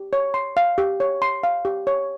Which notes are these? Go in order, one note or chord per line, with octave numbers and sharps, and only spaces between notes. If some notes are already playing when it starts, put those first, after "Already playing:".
Already playing: G4
C#5
C6
F5
G4
C#5
C6
F5
G4
C#5